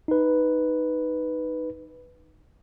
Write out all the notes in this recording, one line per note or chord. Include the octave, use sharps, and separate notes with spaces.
D#4 B4